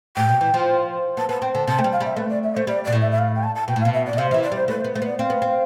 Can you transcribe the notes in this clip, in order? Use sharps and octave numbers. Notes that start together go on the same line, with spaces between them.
A2 G5
B2
E3
F3
B3 A5
B3 A5
C4 G5
D3 A5
C3 A5
A3 G5
G3
F5
G3 E5
A3 B4
D5
E5
A3 C5
G3 D5
B2 D5
A2
E5
E5
F5
G5
A5
A5
B2 G5
A2
F5
B2
E5
D5
B2
C3 F5
E3 F3 E5
D5
G3 C5
A3 B4
C5
B3
A3 C5
B3 D5
C4 F5
B3
C4